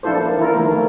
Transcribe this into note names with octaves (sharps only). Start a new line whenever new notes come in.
F3 D4 E4 F4 A4 C5
A#3
E3 E4 F4 A#4
D#3 F3 A3 A#3
A3 A#3